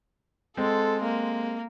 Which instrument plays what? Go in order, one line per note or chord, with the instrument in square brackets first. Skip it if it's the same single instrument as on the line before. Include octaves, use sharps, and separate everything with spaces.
[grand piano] G#3 C4 [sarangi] A4
[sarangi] A#3